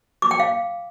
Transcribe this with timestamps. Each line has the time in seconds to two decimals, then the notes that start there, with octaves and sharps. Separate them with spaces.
0.22 D6
0.31 G5
0.40 F5